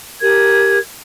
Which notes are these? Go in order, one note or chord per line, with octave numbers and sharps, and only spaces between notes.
G4 A#4 G#6